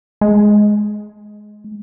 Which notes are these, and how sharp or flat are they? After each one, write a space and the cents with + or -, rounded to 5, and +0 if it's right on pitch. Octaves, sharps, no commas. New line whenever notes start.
G#3 +15